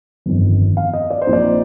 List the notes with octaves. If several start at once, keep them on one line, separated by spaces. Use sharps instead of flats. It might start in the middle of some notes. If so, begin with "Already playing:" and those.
G1 F2 D#3
F5
D#5
D5
C5
A#1 A#2 F3 C4 D#4
D5